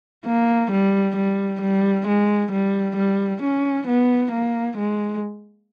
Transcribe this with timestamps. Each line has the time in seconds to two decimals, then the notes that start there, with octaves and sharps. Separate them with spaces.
0.26 A#3
0.71 G3
1.16 G3
1.61 G3
2.07 G#3
2.51 G3
2.96 G3
3.42 C#4
3.87 B3
4.32 A#3
4.77 G#3